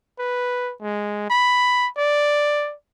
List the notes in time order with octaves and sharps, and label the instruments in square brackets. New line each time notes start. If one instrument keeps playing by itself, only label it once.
[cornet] B4
G#3
B5
D5